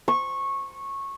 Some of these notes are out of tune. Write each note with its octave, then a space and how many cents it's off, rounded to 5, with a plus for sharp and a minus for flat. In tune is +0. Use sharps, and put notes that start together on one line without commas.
C#6 -15